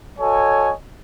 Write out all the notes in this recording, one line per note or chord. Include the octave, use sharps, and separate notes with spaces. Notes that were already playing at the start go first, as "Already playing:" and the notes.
F#4 A4 C#5 D#5 G#5